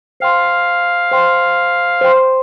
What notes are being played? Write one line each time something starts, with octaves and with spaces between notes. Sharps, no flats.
C5 F5 G5 C6
C5 G5 C6
C5 G5 C6